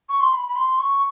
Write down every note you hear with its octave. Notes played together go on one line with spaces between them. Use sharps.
C#6
C6
B5
B5
C6
C#6